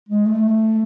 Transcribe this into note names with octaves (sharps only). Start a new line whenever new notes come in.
G#3
A3